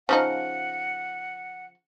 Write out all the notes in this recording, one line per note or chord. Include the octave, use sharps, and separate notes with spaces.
C#3 F3 D#4 F#5